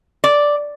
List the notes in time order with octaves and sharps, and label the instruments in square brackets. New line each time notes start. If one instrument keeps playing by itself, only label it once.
[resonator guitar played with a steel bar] D5